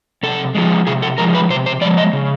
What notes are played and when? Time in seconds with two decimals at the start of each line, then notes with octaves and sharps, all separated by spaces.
0.23 C3 A4
0.55 F3 G#3
0.87 C3 G#4
1.02 A4
1.18 F3 G#3 A#4
1.35 B4
1.50 C3 C5
1.66 C5
1.81 F3 D5
1.85 G#3
1.98 D#5
2.13 C#3